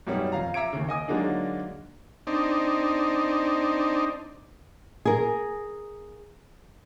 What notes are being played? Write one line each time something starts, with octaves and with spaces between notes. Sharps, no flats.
F#2 B2 G3 C#4 D#4
F2 F5 A#5
E5 A#5 D6 G#6 D7
D#2 C#3
D#5 G#5 D#6
D3 F#3 G#3 A#3 D4 D#4
C4 D4 D#4
G#4 A#4